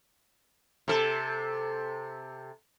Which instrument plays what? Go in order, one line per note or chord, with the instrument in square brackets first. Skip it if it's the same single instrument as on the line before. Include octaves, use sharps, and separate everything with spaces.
[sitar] C3 A4